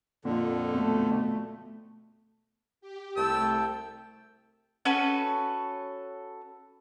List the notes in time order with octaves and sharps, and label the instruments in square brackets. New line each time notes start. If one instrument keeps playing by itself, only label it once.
[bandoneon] F2 D3 [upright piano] A#2
[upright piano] B2 [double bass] A3
[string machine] G4
[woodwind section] C2 G5 A5 [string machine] A3 [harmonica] E6
[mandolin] C#4 F#4 A4 B4